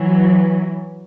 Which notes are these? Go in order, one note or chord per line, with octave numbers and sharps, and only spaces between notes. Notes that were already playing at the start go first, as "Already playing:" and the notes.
Already playing: E3 F#3